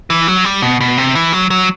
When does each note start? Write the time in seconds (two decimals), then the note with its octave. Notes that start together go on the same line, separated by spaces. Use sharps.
0.10 E3
0.27 F#3
0.45 G3
0.62 B2
0.81 B2
0.97 C3
1.15 E3
1.33 F#3
1.50 F#3